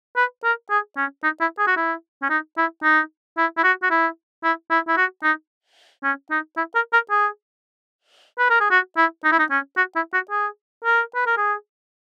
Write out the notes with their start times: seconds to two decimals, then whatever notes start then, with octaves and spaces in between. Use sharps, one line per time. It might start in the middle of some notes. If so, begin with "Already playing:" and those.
0.16 B4
0.44 A#4
0.70 G#4
0.97 C#4
1.24 D#4
1.41 E4
1.58 G#4
1.67 F#4
1.77 E4
2.23 C#4
2.30 D#4
2.57 E4
2.83 D#4
3.38 E4
3.57 E4
3.64 F#4
3.83 F#4
3.91 E4
4.44 E4
4.71 E4
4.88 E4
4.97 F#4
5.23 D#4
6.04 C#4
6.31 D#4
6.57 E4
6.75 A#4
6.93 A#4
7.10 G#4
8.39 B4
8.50 A#4
8.60 G#4
8.71 F#4
8.97 E4
9.24 D#4
9.32 E4
9.39 D#4
9.51 C#4
9.77 F#4
9.96 E4
10.13 F#4
10.31 G#4
10.84 A#4
11.15 B4
11.26 A#4
11.37 G#4